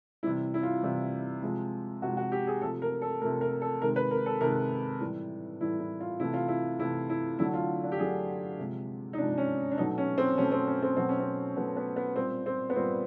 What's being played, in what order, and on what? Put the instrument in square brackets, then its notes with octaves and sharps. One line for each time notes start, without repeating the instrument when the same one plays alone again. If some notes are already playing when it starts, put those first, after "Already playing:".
[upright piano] C3 E3 G3 E4
E4
F4
C3 E3 G3
C3 F3 G#3
C3 F#4
F3 G#3
F#4
G4
G#4
C3 F3 A3 A4
A#4
A4
C3 F3 A3 A#4
A#4
A4
C3 D#3 G#3 A#4
B4
A#4
A4
C3 D#3 G#3 A#4
A2 E3 G3
A2 E3 G3 E4
E4
F4
C3 E3 A3 E4
F4
E4
C3 E3 A3 E4
E4
D3 F#3 A3 E4
F4
D4
G4
D3 F#3 A3 G#4
C3 F3 G#3
D#4
C3 F3 G#3 D4
C#4
D4
B2 F#3 A3 D#4
C#4
C4
B2 F#3 A3 C#4
C4
C#4
C4
B2 F#3 A3 C4
C#4
C4
B2 F#3 A3 B3
B3
B3
A#2 G3 C4
C4
B3
A#2 G3 C4